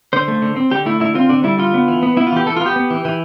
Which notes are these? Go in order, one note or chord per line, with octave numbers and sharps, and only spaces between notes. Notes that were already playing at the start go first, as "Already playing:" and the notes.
D3 C5
A3
D3
C4
D3 G4
A3 E4
D3 E4
C4 F4
D3 D4
G3 E4
D3 F4
B3
E3
B3
B3 E4
F4
E3 G4
E3 A4
F4
B3 G4
B3
E3
E3